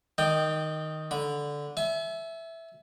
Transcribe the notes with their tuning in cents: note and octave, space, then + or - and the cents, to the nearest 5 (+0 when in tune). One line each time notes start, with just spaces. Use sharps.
D#3 +0 D5 +45 G5 +0
D3 -10 B5 -20
E5 +0 G#5 +45